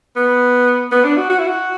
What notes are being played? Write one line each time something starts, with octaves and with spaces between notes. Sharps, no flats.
B3
B3
D4
F#4
F#4
E4
F#4